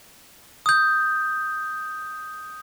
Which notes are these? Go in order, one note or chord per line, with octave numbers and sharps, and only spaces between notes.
D#6 G6